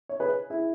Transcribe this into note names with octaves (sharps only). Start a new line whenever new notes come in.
C#5
G#4 B4
E4 G#4